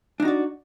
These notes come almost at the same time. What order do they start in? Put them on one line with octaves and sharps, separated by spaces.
D4 D#4 F#4 D5